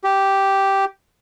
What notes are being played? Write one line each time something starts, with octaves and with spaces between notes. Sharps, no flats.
G4